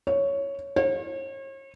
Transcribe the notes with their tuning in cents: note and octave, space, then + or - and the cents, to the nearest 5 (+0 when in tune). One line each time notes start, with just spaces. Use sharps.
C#5 +5
C#5 -40